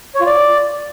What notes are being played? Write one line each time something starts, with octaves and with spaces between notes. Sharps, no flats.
C#5
F4
D5